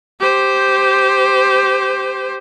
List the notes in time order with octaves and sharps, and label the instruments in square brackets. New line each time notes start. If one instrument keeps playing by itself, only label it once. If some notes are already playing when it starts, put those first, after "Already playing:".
[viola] G4 C5